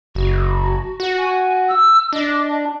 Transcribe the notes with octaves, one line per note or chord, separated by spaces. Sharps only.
F#1 F#4
F#4
G#5
E6
D4 D#5